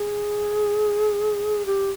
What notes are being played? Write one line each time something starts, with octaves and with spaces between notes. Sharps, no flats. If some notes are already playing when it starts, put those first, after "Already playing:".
Already playing: G#4
G4